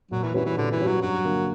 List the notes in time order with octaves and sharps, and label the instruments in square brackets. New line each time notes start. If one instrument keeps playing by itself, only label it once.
[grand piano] A#2 [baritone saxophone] F#3
[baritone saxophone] E3
[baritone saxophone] E3 [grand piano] G3 C#4 F#4 B4
[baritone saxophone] E3
[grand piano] A#2 [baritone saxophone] D3
[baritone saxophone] E3
[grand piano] G3 C#4 F#4 B4
[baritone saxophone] F#3
[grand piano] G2 [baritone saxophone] F#3
[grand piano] D3 A#3